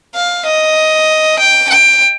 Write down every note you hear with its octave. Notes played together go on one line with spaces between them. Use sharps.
F5
D#5
G5
G5